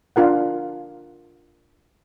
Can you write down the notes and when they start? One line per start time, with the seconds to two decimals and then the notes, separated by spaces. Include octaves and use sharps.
0.16 D4 F4 A#4 F#5